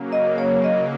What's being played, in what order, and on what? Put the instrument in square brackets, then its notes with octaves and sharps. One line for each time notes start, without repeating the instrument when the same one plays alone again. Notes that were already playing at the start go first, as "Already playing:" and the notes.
Already playing: [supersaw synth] C#3 F#3 A#3
[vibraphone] D#5
C#5
D#5